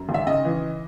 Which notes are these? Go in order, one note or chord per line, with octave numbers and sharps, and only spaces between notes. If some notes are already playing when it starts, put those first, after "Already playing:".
Already playing: F#2
G#1
E5
C#3 D#5
E3